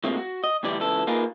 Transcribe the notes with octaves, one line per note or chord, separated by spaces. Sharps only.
A2 C3 G#3 A#3 C4 F4
F#4
D#5
D2 B2 E3 G3 D5
C#2 E3 A4
A#3 D#4 F4 G#4 A#4 B4